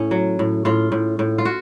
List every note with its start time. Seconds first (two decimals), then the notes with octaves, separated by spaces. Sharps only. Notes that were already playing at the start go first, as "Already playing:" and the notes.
Already playing: A2 C#4
0.11 F#3
0.39 A2
0.65 A2 F4
0.92 A2
1.19 A2
1.38 F4
1.45 F#4